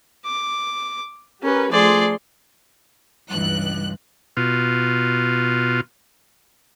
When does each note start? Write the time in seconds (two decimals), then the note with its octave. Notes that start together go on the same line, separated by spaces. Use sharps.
0.25 D6
1.43 C#4 G4 A#4 B4
1.72 F3 A3 G#4 D5 C6
3.30 C#2 G2 E3 F#6
4.37 B2 F4